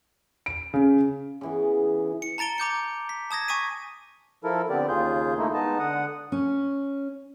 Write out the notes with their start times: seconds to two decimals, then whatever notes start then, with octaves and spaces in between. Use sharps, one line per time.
0.46 D7
0.74 C#3
1.41 C#3 E3 B3
2.22 C#7
2.38 A5 A#5 A6 D7 G7
2.58 A#5 D6 G6 C#7
3.09 B6
3.31 A5 D#6 G#6 A#6
3.48 G#5 C#6 D#6 B6 D#7
4.44 F3 E4 A4 A#4
4.70 D3 B3 C4 G4 D5
4.89 D#2 C#3 F4 G#4 G6
5.38 A3 A#3 D#4 E4
5.54 G#3 B3 D#4 D#5 A5
5.79 D3 F#5 D#6
6.32 C#4